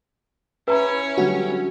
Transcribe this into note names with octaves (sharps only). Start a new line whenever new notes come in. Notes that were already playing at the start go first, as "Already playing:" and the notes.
C#4 E4 B4 C#5 E5 A#5 B5
D3 F#3 G3 F#4